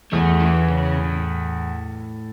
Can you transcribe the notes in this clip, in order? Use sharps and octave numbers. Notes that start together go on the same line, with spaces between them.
E2 A3
E3
C#3
A2